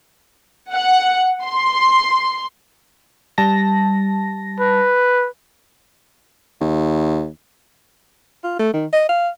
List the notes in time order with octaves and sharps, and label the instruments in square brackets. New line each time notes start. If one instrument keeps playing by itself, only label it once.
[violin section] F#5
C6
[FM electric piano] G3 A5 A#6
[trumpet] B4
[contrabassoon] D#2
[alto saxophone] F4
A3
D#3
D#5
F5